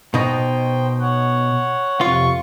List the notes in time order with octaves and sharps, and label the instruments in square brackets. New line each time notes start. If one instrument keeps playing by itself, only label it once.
[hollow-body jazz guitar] B2 D#4 [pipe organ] C5 G5
[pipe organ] C#5 F#5
[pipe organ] F2 C3 C#6 [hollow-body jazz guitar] F4